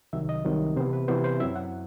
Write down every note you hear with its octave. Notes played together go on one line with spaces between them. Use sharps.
C2 C3 D#3 F#3 E5
D#5
C2 C3 D#3 F#3
C3 E3 B3 C5
B4
C3 E3 B3 C5
C5
F#2 F#3 C4 E4 E5
F#5